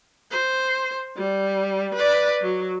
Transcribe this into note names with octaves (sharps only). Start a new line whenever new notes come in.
C5
G3
B4 D5
F#3